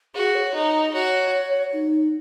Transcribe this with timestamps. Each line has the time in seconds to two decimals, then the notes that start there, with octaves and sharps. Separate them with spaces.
0.15 F#4 G#4
0.35 C#5
0.54 D#4 D#5
0.93 F#4 C#5
1.73 D#4